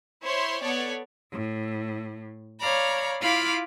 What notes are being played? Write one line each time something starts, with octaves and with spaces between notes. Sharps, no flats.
E4 C5 C#5 C6
B3 A4 C#5 D5
A2
C#5 D5 F5 A#5 B5
E4 F4 F5 B5 D6